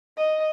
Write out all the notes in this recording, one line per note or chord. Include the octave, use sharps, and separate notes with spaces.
D#5